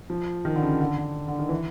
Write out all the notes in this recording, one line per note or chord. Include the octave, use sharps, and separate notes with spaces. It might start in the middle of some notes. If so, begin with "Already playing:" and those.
F3
D#3
D3
C#3
D3
D3
D3
D#3
E3